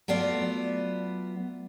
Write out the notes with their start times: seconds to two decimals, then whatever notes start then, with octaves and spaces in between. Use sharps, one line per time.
0.08 F#3 A3 B3 F4 D5